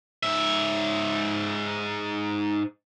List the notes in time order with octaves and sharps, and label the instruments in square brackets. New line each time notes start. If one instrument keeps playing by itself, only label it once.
[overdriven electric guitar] G#2 E5